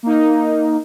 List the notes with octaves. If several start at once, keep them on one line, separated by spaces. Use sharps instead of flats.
A#3 D#4